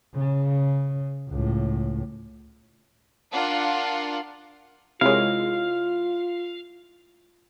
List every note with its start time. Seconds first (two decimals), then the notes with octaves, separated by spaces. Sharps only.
0.15 C#3
1.29 C#2 A2
3.32 D4 F4 A#4 F5 F#5
5.01 C3 G#3 E4 F4 A#4 C#5 F5